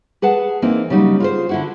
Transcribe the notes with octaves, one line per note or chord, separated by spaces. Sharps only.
G#4 B4 F#5 A5
E3 A#3 C4 D#4
C#3 F#3 G3 D#4
F4 G#4 C5
D3 E4 F#4